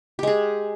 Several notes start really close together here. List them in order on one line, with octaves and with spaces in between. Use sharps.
G4 G#3 G#4